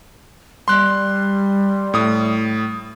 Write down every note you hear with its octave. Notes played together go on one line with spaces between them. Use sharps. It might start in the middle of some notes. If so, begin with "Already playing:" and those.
G3 C6 F#6
A2 D#6